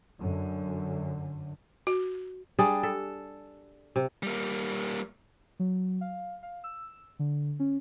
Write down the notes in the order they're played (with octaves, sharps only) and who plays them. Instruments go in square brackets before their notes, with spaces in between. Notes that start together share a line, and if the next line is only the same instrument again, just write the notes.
[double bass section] F#2 D3
[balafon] F#4
[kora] G3 D4 G#4
A4
C3
[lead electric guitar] G3 A#3
[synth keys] F#3
F5
F5
E6
D3
C#4